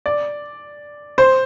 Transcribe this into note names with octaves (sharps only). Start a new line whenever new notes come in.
D5
C5